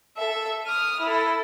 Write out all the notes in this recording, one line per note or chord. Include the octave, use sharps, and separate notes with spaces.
A4 E5
D#6 F6
E4 A4